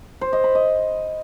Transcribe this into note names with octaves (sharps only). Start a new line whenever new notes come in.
C5
D#5
B5
D#5